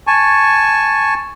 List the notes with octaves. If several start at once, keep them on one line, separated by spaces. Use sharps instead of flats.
G#5 A5 C#6